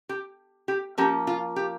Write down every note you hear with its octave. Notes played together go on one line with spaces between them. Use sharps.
G4
G4
F3 A#3 C#4 G4
F4
G4